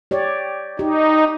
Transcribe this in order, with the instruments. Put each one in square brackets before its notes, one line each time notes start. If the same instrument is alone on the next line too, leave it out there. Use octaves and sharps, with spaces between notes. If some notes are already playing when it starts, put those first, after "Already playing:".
[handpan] G4 C#5 D5
[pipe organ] D#4 [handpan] G4